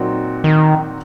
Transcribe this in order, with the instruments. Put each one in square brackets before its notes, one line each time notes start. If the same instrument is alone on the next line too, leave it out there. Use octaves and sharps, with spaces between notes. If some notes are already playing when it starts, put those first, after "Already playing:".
Already playing: [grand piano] A#2 F#3 C4 D#4 F#4
[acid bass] D#3